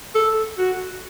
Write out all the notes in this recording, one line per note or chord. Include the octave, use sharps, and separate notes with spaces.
A4
F#4